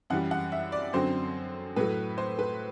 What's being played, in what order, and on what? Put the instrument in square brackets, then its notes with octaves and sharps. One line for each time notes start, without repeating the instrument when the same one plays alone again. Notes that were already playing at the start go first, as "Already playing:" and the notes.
[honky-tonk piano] F#2 E3 G3 F#5
F#5
E5
D5
F#2 D3 F#3 C4 C5
A2 F#3 A3 B4
C5
B4